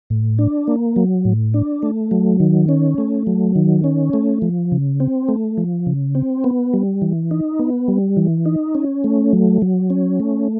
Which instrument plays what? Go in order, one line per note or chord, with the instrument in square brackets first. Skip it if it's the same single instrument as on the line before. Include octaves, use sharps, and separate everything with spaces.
[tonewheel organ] A2
D4
A#3
F#3
A2
D4
A3
F#3
D#3
C#4
A3
F#3
D#3
C#4
A3
F3
C#3
C4
A3
F3
C#3
C4
B3
G3
E3
D#4
B3
G3
E3
D#4
C#4
A3
F#3
F#3
C#4
A3